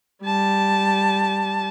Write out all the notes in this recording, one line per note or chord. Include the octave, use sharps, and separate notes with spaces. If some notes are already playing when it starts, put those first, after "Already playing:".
G3 A5